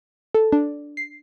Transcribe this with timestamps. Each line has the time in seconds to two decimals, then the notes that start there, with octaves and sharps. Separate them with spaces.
0.35 A4
0.52 D4
0.97 C7